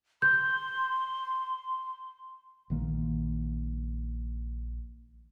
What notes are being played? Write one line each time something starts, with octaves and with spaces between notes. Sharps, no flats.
C6 G6
A#1 D#3 A#3